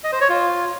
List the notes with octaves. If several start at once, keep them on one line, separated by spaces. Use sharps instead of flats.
D#5
C5
C#5
F4